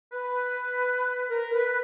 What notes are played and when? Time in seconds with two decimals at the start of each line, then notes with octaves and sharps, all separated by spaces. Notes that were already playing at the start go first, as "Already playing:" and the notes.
0.12 B4
1.30 A#4
1.54 B4